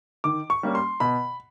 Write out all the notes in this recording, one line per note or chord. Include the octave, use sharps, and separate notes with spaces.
D#3 D6
C#6
G3 A#3 C#4
C6
B2 B5